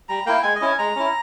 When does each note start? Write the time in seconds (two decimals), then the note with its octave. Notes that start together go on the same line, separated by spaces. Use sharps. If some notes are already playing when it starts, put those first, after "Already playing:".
0.09 G3 A#5
0.26 A#3 E4 G5
0.43 G#3 G#5
0.56 D#5
0.61 C#4 E4 G#5
0.78 G#3 A#5
0.96 C#4 E4